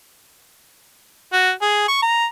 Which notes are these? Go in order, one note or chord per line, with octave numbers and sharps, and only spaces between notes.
F#4
G#4
C#6
A#5